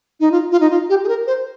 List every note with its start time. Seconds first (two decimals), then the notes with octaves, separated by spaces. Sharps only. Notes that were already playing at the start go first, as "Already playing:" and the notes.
0.20 D#4
0.32 F4
0.51 F4
0.60 D#4
0.70 F4
0.89 G4
1.04 G#4
1.08 A#4
1.27 C5